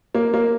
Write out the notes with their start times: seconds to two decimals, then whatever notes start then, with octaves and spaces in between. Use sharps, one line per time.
0.15 A#3
0.34 A#3